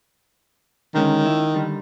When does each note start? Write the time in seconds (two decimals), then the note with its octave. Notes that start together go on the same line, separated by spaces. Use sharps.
0.95 D3 D#3 G#3 C#4
1.26 E4
1.54 D3 G3